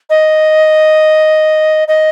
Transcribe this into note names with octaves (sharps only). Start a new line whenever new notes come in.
D#5
D#5